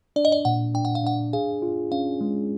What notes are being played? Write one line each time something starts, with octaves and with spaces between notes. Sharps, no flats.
D4 D5
D#5
D5
A#2 F#5
D4 G5
F#5
F5
D4 F#5
G#4 F5
F4
C#4 F5
G#3